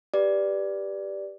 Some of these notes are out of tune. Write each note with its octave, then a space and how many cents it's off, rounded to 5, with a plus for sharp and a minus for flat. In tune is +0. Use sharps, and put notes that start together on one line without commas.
G4 +0 B4 -10 D5 +0